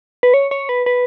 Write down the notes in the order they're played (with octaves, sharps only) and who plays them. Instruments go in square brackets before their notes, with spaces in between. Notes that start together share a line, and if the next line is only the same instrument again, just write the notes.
[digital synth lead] B4
C#5
C#5
B4
B4